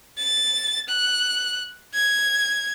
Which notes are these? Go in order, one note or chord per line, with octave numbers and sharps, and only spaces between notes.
A6
F#6
G#6